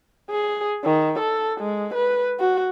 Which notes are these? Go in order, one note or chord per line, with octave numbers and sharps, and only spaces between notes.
G#4
D#3
A4
G#3
B4
F#4